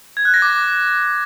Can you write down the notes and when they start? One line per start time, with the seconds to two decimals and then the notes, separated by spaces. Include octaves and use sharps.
0.17 G#6
0.25 F#6
0.34 A#6
0.42 D6